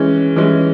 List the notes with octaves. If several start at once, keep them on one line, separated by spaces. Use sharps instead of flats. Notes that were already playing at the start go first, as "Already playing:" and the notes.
Already playing: E3 G#3 C#4
E3 G#3 C#4